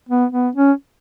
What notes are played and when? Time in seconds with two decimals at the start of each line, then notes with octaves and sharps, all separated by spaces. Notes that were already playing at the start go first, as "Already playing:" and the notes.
0.09 B3
0.32 B3
0.55 C#4